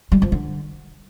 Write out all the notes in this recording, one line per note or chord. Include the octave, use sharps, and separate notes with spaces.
G3
F3
D3